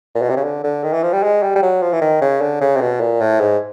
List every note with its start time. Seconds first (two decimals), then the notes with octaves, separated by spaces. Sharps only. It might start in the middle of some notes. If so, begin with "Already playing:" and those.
0.15 A#2
0.22 B2
0.30 C3
0.37 C#3
0.44 D3
0.64 D3
0.84 D#3
0.93 E3
1.03 F3
1.13 G3
1.23 G#3
1.43 G3
1.56 G3
1.63 F#3
1.82 F3
1.93 E3
2.01 D#3
2.21 C#3
2.41 D3
2.61 C#3
2.76 C3
2.81 B2
3.00 A#2
3.21 A2
3.40 G#2